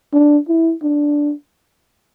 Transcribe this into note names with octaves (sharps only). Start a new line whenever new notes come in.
D4
E4
D4